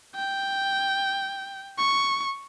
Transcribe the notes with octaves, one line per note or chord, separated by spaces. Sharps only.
G5
C#6